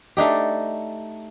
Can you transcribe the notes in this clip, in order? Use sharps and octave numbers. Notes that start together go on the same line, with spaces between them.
A3 D4 D#4 G4